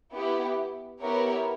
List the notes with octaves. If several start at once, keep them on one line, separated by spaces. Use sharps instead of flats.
B3 E4 G4
B3 E4 G4 A#4 C#5